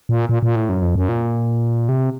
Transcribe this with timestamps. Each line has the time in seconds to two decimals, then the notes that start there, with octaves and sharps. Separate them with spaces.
0.09 A#2
0.29 A#2
0.43 A#2
0.56 A2
0.69 F#2
0.82 F2
0.95 F#2
1.09 A#2
1.89 C3